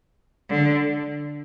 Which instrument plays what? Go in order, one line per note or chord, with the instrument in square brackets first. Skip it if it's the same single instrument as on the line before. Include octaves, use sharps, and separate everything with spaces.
[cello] D3